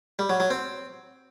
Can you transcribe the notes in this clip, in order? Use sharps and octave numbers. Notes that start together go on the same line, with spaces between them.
G3
F#3
F#3
C4